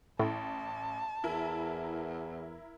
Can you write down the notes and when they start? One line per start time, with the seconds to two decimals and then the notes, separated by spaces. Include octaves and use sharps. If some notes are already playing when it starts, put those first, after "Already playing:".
0.19 A1 A2 A5
1.24 E2 E4 A#4